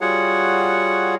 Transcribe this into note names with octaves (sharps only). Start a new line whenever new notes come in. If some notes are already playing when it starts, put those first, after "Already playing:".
G3 F4 F#4 G#4 C#5 F#5